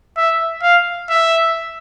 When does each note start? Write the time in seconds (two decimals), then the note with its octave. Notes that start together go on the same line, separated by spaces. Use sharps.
0.17 E5
0.62 F5
1.09 E5